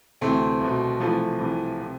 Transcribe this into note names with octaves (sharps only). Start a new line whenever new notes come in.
D2 C3 E3 A3 C4
C2 B2
C2 C3 E3 F3 A3
C2 C3 E3
C3